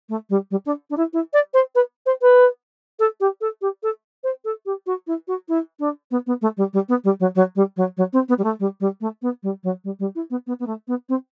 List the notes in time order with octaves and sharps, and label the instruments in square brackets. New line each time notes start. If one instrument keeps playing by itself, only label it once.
[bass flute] A3
G3
G3
D4
D4
E4
E4
D5
C5
B4
C5
B4
A4
G4
A4
G4
A4
C5
A4
G4
F#4
E4
F#4
E4
D4
B3
B3
A3
G3
G3
B3
G3
F#3
F#3
G3
F#3
F#3
C4
B3
G3
A3
G3
G3
A3
B3
G3
F#3
G3
G3
E4
B3
B3
B3
A3
B3
C4